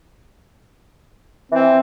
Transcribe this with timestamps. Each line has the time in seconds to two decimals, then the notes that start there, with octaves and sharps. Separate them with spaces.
1.52 E3 C4